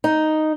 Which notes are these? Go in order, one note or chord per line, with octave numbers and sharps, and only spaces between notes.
D#4